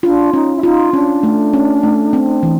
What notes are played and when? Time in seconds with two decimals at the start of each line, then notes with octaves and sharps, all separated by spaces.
0.03 D4 F4
0.33 C#4 D#4
0.56 E4
0.63 D#4 F4
0.93 C#4 D4
1.23 A3
1.53 C#4
1.83 A3
2.13 C4
2.43 E3